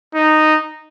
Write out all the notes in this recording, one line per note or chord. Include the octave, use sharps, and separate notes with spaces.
D#4